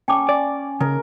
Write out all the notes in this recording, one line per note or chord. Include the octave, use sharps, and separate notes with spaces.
C#4 G5 A5 D6
D5
C#3 A#4